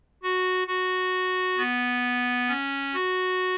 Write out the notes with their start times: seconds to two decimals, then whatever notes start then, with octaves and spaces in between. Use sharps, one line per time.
0.23 F#4
0.68 F#4
1.58 B3
2.49 C#4
2.94 F#4